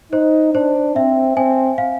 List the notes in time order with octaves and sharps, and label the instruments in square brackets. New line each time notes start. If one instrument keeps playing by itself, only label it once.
[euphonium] D#4 [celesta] C5
[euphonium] D4 [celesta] C5
[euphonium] C4 [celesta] E5
[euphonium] C4 [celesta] G#5
[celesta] F5